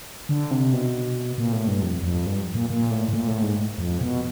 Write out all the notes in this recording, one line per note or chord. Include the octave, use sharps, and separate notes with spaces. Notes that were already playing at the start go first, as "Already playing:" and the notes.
D3
C3
B2
A#2
A2
G2
F2
F2
G2
A#2
A#2
A2
A2
A#2
A2
G#2
F2
B2